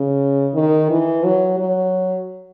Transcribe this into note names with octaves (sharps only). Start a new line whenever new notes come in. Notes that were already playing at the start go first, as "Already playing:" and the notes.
Already playing: C#3
D#3
E3
F#3
F#3